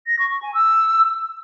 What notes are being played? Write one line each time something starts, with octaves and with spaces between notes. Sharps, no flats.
A#6
C#6
C#6
G#5
E6